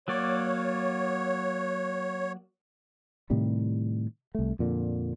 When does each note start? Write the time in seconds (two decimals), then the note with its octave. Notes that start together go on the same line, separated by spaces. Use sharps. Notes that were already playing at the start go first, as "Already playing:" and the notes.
0.08 F#3 A#3 C#5 D5
3.30 A2 C3 D#3 G3
4.35 C2 A3
4.59 F2 A#2 D3